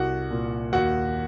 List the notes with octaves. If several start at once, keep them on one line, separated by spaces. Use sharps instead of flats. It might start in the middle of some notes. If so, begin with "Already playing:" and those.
Already playing: C2 F#4 F#5
A#2
D#2 F#4 F#5